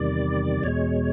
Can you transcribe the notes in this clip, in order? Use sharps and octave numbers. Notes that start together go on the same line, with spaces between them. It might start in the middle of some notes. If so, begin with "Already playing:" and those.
Already playing: E2 C3 D#3 G3 D5
E2 B2 G#3 C#5